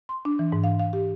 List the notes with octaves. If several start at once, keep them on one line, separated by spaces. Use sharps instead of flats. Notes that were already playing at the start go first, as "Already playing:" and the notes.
C6
D4
E3
G#2
F5
F5
G4